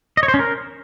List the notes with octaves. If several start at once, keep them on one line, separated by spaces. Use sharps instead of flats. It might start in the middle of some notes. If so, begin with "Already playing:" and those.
D#5
C#5
C5
C#4
A#4